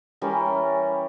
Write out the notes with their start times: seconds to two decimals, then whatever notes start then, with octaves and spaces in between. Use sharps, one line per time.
0.21 E3 G3 C#4 A#4